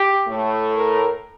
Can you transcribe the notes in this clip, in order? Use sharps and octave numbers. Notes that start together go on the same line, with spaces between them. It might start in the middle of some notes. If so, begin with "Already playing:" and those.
Already playing: G4
A2 A3
A#4